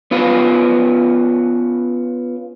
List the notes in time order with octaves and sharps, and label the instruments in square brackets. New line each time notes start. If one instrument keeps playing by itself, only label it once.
[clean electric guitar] B3 C#4 F4 B4